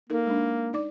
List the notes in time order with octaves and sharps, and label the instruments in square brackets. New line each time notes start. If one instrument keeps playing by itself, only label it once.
[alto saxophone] A#3 [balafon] D#4 A4 A#4
[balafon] G#3 D4
D#4 D5 D6